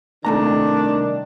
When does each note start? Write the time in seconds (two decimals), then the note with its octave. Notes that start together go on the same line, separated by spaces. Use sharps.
0.25 C2 D#3 A3 D4 A#5